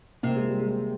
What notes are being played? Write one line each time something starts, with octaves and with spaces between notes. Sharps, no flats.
C3 A#3
G#3
G3
G#3